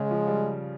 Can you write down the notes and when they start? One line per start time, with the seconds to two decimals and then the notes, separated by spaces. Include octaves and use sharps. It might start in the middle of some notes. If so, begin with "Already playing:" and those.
Already playing: C#3 G#3
0.11 F3
0.27 G3